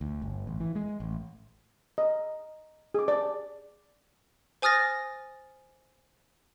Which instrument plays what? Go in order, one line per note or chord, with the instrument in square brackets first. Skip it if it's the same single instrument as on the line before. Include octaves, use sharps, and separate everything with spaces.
[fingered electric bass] D2
G1
A1
E3
G#3
A1
[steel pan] D#5
G#4 D6
D5
[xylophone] C5 G#5 D#6 F6 A6 A#6